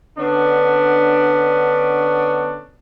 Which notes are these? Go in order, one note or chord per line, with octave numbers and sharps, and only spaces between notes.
D3 B3 C#4 D4